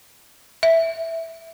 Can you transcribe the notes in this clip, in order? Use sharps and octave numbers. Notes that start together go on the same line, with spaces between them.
E5